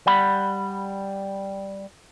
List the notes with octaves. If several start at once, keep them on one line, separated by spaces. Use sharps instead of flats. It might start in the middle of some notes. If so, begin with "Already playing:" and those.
G3 F#5 B5